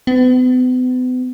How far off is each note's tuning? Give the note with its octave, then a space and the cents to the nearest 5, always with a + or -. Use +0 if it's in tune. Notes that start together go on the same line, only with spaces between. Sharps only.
B3 +40